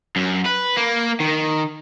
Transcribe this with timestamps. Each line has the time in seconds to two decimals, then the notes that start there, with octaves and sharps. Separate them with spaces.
0.16 F#2
0.45 B4
0.77 A#3
1.20 D#3